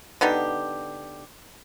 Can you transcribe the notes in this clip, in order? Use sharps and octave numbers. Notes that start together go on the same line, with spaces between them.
D3 B3 D#4 G4